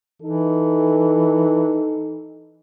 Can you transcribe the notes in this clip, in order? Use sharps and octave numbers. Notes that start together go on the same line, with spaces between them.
E3 D#4 A4